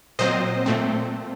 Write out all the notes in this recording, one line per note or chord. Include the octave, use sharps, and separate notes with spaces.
A#2 F#3 C4 C5 D#5
A#2 A3 C4